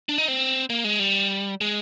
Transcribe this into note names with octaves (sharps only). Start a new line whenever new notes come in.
D4
D#4
C4
A#3
G#3
G3
G#3